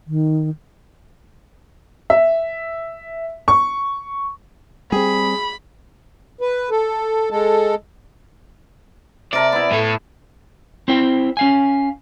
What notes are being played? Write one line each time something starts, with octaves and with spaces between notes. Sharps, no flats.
D#3
E5
C#6
G3 C4 G#4 B5
B4
A4
G#3 A4
C3 A#4 D5 A5
B3 E4
A2 A4
C4 E4 C5 G5
C#4 F5 G#5